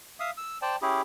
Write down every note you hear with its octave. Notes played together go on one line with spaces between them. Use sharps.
E5 F5 D#6
E6
C5 D5 G5 A5
C#4 E4 G4 G#4